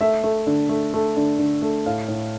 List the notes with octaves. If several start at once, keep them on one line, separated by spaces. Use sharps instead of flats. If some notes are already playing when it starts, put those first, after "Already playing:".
A3 E5
A3
D3
A3
A3
D3
D3
A3
A2 F5
A2